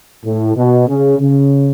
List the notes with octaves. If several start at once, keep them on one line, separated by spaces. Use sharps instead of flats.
A2
B2
C#3
C#3